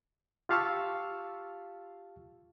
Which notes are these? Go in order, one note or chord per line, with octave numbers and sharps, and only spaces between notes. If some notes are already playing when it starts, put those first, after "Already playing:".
F4 G4 F5 A5 C#6 E6